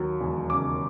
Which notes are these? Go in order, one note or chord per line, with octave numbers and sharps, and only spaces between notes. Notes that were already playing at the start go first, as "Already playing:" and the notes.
Already playing: D#2 F#3
E1
C#3 D6